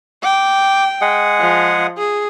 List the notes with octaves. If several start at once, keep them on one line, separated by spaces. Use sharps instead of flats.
G5 D6
G#3 G#4 F#5
F3
G#4